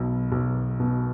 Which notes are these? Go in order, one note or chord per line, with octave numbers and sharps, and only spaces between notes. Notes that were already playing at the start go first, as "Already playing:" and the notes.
Already playing: B1 B2
B1
B2